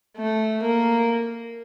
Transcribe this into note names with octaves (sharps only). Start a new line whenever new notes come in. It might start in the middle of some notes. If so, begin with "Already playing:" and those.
A3
A#3